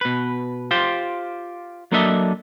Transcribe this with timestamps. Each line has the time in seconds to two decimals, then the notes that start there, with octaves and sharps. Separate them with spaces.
0.01 B2 B4
0.71 F4 G4 C5
1.92 F#3 A#3 D4 A4 D#5 E5